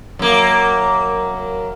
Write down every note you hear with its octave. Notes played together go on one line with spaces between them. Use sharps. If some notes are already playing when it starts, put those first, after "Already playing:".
F#2 A#3